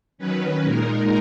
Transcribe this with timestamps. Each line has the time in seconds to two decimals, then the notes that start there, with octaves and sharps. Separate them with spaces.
0.18 D#3 F#3 C#4 B4
0.64 A#2 G#3 D#4 A#4